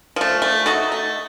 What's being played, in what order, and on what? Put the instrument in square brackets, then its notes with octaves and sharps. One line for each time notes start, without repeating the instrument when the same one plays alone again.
[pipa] F3 A3
A3
D#4 F#4 A4
A3